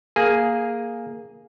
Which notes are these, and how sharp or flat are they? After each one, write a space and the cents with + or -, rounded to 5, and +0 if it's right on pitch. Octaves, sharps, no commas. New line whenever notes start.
A#3 +0 G#4 +0 G#5 +0